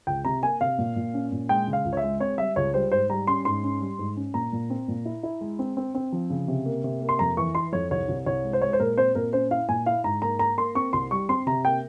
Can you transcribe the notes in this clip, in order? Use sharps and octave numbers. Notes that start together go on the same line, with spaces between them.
C#2 G5
C3 A#5
A#3 G#5
C3 F5
A#2
A#2
C#4
A#2
G#3 G5
C#3
F5
C#2
C#5
E5
G#3
C4 C#5
G3 E5
C#2 C#5
G3 C5
G#2 C5
G3 A#5
C#4 C6
G#2 C6
C#4
G3
G#2
C#4
A#2 A#5
A#2
C4
A#2
E4
E4
G#3
C4
C4
C4
F3
C#3
C3
A#3
C3
A#3
C6
F2 A#5
E3 C#6
E4 C6
F2 C#5
C2 C#5
C2
C2 C#5
G#3
C5
G#3 C#5
C5
A#2 A#4
C4 C5
A#2 A#4
C#4 C5
E4 F5
A#2 G#5
E4 F5
G#2 A#5
A#3 A#5
A#3 A#5
A#3 C6
C4 C#6
C2 C6
G3 C#6
C4 C6
C3 A#5
A#3 G5